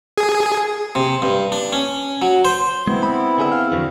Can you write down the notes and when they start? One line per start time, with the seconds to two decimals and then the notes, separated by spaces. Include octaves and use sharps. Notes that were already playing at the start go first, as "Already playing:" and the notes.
0.18 G#4
0.95 C3
1.22 G2
1.52 D4
1.73 C#4
2.22 F#3
2.45 C5
2.87 G#3 B3 C4 E4
3.03 B5
3.38 D3 G#4 E5
3.52 F5
3.72 F2 D3 E3 F#4